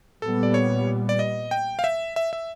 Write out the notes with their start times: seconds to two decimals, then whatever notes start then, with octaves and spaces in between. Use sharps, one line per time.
0.22 A#2 G3 B3 A4
0.43 D5
0.54 C#5
1.09 D5
1.19 D#5
1.51 G5
1.79 F5
1.84 E5
2.16 E5
2.33 E5